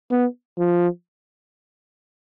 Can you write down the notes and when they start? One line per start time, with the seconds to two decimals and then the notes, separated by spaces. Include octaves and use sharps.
0.11 B3
0.59 F3